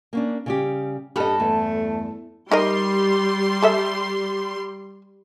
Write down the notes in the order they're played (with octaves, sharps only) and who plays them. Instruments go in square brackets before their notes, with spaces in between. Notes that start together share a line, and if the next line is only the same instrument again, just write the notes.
[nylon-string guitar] A#3 C#4 D4
C#3 G3 G4
[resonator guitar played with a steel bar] G2 A4 [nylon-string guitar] G4 D#5
[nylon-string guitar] E2 [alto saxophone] A3
[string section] G3 C6 [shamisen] D#4 A#4 D#5
[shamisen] G#4 A4 E5